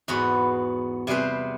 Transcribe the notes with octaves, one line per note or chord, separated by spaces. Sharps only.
E2 G#2 B3 F#4 B5
C3 G3 G#4 B4 C5